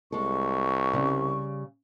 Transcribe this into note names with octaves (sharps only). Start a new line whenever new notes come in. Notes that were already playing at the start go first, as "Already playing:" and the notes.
C2 G#3 A4 C#6
C#3 G3